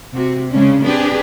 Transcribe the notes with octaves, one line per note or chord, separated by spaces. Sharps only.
C3 F#4
C#3 G#3 C#4 D4
C4 D4 G4 G#4 B4